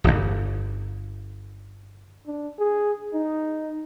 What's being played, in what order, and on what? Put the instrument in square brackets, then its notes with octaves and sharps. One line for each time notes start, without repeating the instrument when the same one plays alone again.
[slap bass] D1 G1
[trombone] D4
G#4
D#4